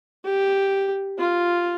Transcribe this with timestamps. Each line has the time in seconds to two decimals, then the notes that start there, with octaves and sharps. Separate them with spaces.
0.25 G4
1.18 F4